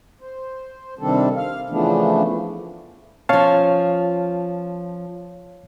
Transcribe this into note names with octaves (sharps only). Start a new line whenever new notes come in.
C5
C3 D#3 G3 C4 D4 A4
F5
C#3 E3 F3 A3 B3 D4
F3 C#4 C#5 F5 A5